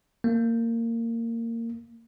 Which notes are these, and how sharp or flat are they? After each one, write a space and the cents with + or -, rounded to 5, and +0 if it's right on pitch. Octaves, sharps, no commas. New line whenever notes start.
A#3 -20